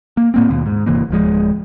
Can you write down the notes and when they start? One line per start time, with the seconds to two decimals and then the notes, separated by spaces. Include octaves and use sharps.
0.17 A#3
0.34 A2 A#3 C4
0.50 D#2 B2
0.66 G#2
0.86 G1 C3 E3 A#3
1.11 D1 F3 G#3